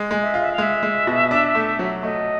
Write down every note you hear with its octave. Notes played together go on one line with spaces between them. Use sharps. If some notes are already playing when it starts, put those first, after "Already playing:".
Already playing: G#3
G#3
E5
F4
E5
F5
G#3 E5
G#3
B2
D4
A3
F#3
A3 D#5